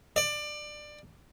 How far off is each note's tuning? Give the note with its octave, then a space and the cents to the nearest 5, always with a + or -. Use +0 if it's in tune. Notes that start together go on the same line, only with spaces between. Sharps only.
D5 +20